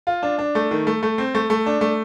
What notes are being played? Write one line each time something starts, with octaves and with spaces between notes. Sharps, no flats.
F4
D4
D4
A3
D#3
A3
A3
C4
A3
A3
D4
A3